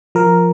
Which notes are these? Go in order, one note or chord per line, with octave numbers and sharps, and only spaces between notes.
F3 A#4